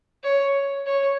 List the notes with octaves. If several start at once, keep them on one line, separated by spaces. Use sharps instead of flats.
C#5
C#5